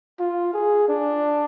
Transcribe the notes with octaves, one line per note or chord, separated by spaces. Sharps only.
F4
G#4
D4